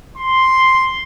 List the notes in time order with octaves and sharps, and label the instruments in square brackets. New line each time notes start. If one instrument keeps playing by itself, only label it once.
[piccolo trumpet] C6